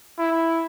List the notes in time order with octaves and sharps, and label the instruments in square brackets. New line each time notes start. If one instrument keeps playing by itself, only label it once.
[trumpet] E4